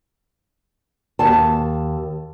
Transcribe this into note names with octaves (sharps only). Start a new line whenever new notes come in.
D#2 A5